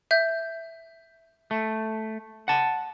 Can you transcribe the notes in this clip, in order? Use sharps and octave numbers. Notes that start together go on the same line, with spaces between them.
E5 G6
A3
F#5 A5